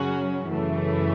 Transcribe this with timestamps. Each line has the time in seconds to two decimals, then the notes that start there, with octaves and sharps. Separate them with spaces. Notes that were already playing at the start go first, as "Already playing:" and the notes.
Already playing: F#2 C#3 F#3 C#4 F#4
0.48 F#2 C#3 E3 A3